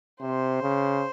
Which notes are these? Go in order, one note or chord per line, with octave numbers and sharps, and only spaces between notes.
C3 C5
C#3